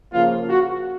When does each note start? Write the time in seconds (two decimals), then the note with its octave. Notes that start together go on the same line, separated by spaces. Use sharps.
0.12 C#3 F3 A#3 F4
0.49 F#4